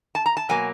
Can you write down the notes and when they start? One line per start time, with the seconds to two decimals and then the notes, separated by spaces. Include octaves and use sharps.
0.15 A5
0.26 A#5
0.37 A5
0.49 B2 F#3 A#3 G#5